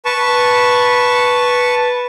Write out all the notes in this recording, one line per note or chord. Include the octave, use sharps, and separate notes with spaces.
B4 A5 C#6